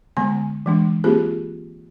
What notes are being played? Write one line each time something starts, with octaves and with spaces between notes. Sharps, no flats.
D3 G#3 B3 G#5
E3 G#3 D4
A#3 C4 F4 G4 G#4